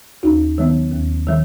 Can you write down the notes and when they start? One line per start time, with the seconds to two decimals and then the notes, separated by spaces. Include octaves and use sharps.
0.23 D#2 D#4 F#4
0.58 D#3 F#3 B3
0.92 D#2
1.27 D#3 F#3